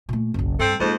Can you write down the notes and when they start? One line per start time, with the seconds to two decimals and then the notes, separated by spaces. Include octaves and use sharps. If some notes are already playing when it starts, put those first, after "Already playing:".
0.09 A#2 A3
0.34 F#1 B1
0.59 G2 C4 A4
0.80 F2 G#2 G#3 A#3 C5